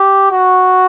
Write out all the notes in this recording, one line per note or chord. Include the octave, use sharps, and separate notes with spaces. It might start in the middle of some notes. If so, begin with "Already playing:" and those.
Already playing: G4
F#4